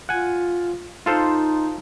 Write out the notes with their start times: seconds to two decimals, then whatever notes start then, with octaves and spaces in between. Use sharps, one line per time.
0.09 F4 F#5 G#5
1.06 D#4 F4 A4 C5